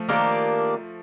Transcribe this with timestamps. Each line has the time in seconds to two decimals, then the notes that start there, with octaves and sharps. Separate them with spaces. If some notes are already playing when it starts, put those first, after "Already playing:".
Already playing: F3 A3
0.09 D#3 A#3 D4 G4